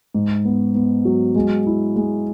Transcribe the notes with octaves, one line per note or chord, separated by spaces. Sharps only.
G#2
B3
B3
F#3
G#3
E4
G#3